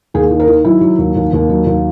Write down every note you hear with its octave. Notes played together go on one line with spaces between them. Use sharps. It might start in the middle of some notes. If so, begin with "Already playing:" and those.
D#2 G#4
D#3
A#4
D#3
F#3 E4
F#3
D#2
D#2
D#2
F#3
D#2